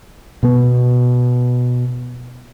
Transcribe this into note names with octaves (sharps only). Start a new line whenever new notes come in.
B2 B3